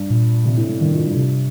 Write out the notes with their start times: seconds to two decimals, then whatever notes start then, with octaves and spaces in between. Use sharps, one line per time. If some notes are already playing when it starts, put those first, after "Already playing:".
Already playing: G2
0.10 A#2
0.45 C3
0.57 A2
0.69 A2
0.81 G2 D#3
0.93 F2
1.05 G2
1.17 C3